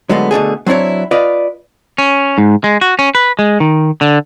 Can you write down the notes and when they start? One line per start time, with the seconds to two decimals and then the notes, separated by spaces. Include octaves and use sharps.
0.09 D3 F#3 G#3 A3 B3
0.31 B2 D3 A3 G#4
0.66 F#3 C4 D4 E4 C#5
1.11 F4 B4 D5 D#5 F5
1.98 C#4
2.38 G#2
2.64 G#3
2.81 F#4
2.99 C#4
3.15 B4
3.39 G#3
3.60 D#3
4.01 D3